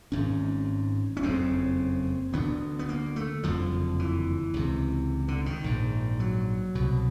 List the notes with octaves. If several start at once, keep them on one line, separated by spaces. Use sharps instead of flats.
G#1 G#2 C#4
C#4
F#1 F2 C#3 C4
D2 D3 B3
B3
A#3
A3
F#1 F2 D3 F3
E3
C#2 C3
D3
D#3
A#1 G#2
F#3
C2 B2